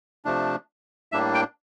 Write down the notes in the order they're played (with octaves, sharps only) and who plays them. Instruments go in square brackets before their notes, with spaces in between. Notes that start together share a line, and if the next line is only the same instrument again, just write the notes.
[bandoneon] C3 F3 A3 D4
A2 G3 A#3 D4 E5
G5